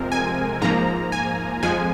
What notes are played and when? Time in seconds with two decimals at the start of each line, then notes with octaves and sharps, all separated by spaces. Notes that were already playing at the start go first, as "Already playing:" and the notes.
Already playing: F2 C3 F3 G#3 C4 A#4
0.12 G#5
0.62 G#2 F3 A#3 A#5
1.12 G#5
1.63 F2 F3 G#3 G#5